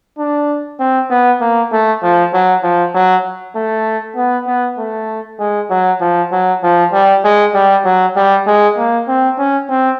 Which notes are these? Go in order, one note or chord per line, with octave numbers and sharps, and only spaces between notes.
D4
C4
B3
A#3
A3
F3
F#3
F3
F#3
A3
B3
B3
A3
G#3
F#3
F3
F#3
F3
G3
G#3
G3
F#3
G3
G#3
A#3
C4
C#4
C4